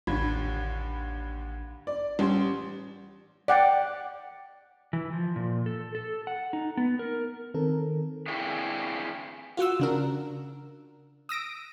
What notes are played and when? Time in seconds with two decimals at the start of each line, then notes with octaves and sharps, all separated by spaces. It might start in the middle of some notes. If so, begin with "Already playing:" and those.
0.07 A1 D#2 D3 B5 G#6
1.87 D5
2.19 A1 G3 C#4 G4 C6
3.48 D5 F#5 G5
4.93 E3
5.13 F3
5.36 A#2
5.66 A4
5.95 A4
6.27 F#5
6.53 D#4
6.77 B3
6.99 A#4
7.54 D#3 C4 A4 A#4
8.28 C4 D4 E4 G4 G#4 F5
9.57 F4 F#4 F#5 E6
9.80 C#3 D4 A#4
11.29 D#6 E6 A#6 D7